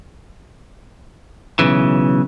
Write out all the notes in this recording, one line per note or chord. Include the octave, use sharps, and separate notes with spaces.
B1 C#3 E3